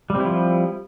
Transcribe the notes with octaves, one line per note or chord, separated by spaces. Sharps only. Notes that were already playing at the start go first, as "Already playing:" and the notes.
F3 G3 C4 E4